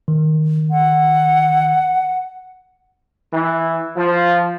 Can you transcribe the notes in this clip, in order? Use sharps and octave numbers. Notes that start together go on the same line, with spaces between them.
D#3
F#5
E3
F3